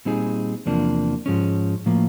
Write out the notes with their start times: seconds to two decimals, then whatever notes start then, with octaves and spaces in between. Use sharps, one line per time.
0.05 A#2 G3 C4 D#4 G#4
0.66 E2 C3 F3 A#3 D4
1.26 G#2 F3 G#3 C#4
1.86 A2 F3 A#3